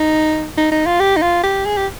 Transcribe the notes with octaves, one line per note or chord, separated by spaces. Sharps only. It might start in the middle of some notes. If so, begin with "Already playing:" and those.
Already playing: D#4
D#4
D#4
F4
G4
D#4
F4
G4
G#4
G4